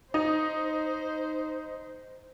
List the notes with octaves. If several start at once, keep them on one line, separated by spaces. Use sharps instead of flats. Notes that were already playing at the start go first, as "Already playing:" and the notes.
D#4 C5